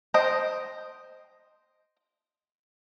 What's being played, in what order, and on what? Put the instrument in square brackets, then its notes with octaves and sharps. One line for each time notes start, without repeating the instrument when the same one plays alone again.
[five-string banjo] C5 D#5 G5